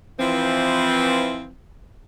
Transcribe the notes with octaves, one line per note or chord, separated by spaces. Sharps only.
E3 F3 C4